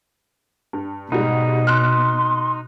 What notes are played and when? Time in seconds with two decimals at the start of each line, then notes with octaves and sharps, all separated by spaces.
0.73 G2
1.12 G#2 B2 G3 D#4
1.67 C6 F6 F#6